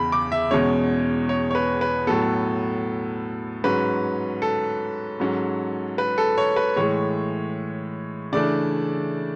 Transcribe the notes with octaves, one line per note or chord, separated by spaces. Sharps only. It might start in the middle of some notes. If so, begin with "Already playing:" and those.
Already playing: E2 C#3 B5
D6
E5
E2 B2 G#3 C#4 C#5
C#5
C#5
B4
B4
A2 F#3 B3 A4
G#2 F#3 C#4 B4
A4
G#2 F#3 C#4
B4
A4
C#5
B4
A2 E3 G#3 C#5
C#3 E3 A3 D4 D5